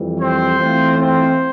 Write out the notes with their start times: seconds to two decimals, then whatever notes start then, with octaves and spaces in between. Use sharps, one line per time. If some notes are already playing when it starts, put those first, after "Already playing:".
Already playing: F2 E3 G3
0.20 C4 C5
0.59 E3 A3 C4 F4
0.98 C4 C5